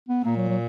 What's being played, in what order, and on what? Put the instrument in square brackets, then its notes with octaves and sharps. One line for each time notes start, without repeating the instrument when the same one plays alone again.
[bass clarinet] B3
[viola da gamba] A#2 [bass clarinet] A#3
[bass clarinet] F#3
F#3